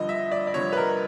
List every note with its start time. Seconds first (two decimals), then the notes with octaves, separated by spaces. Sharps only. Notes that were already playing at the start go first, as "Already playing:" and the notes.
Already playing: G2 D3 F3 D#5
0.09 E5
0.32 D5
0.47 D5
0.54 G2 D3 F3 C#5
0.73 B4
0.77 A#4